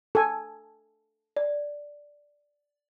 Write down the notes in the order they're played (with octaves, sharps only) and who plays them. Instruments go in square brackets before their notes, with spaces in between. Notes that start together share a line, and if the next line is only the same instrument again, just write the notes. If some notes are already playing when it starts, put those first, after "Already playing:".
[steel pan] A4 G#5
[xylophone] D5